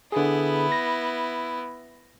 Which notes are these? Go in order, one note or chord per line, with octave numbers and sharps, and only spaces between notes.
D3 B3 E4 G#4
A#6